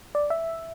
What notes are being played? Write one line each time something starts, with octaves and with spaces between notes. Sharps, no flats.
D5
E5